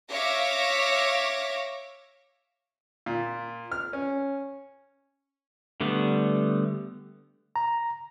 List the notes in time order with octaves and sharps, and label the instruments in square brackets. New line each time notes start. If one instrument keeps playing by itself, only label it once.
[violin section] C#5 E5 F5 D6 A#6
[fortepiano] A#2
F6
C#4
[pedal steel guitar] D3 G3 A3 B3
[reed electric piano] A#5